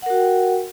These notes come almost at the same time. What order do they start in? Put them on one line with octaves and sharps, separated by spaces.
F#5 A#4 F#4 G5